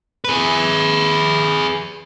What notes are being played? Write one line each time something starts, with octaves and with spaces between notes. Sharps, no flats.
G#4 B4